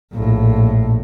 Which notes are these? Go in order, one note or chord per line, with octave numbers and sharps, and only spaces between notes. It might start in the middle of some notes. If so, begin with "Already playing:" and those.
A#1 A2